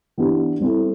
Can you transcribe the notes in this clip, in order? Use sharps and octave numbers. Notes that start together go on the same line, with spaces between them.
E3 B3 D4 G4
G3 C4 E4 A4